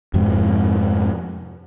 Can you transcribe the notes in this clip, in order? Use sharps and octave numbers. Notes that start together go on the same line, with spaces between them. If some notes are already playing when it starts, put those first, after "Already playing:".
F2 G#2 C3 F3